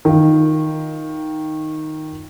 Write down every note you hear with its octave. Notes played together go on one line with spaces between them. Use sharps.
D#3 F4